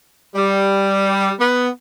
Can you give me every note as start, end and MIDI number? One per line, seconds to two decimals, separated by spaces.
0.36 1.32 55
1.39 1.68 59